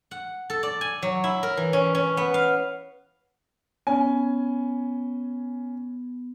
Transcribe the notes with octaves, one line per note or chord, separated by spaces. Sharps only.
F#5
A4
D5
G#5
F#3
E4
A#4
E3
C#4
C#4
B3
F5
B3 C#4 G#5